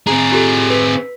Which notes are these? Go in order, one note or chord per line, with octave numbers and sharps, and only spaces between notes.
C4 G#4 A#5
F4 G4 A4
B4 B6